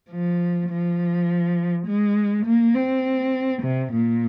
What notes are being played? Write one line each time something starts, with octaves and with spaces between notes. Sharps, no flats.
F3
F3
G#3
A#3
C4
C3
A#2